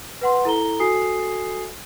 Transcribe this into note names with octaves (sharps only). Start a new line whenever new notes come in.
B4 F#5 C6
E4 A4 A#5 G7
F#4 A4 G#5 D#6 C7